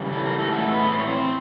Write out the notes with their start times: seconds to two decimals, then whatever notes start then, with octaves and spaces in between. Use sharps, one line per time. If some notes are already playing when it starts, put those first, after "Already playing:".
Already playing: C#3 E3 G3
0.13 A4
0.25 A#4
0.39 A3 A4
0.52 A2 E3 G#3 A3 B3 A4
0.72 B3 B4
0.92 C5
0.99 C#5
1.07 C4 C5